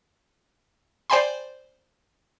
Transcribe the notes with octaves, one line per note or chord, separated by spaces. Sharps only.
C5 D5 G5 G#5 B5 C6